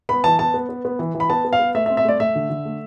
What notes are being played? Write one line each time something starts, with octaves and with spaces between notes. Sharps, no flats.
B3 B5
E3 A5
B3 A5
B3
B3
B3
E3
E3
B5
B3 A5
B3
F5
B3
A3 E5
E5
C4
E5
A3 D5
A3 E5
D3
D3
A3